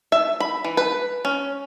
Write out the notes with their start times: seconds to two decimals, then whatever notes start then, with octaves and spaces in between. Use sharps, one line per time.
0.12 E5
0.40 B5
0.64 E3
0.77 B4
1.25 C#4